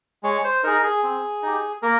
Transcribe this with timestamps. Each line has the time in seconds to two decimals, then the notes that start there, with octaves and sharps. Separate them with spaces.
0.23 G#3 C#5
0.44 C5
0.64 D#4 G#4 A#4
0.83 G#4
1.03 C4
1.43 D#4 G4
1.82 A#3 A#4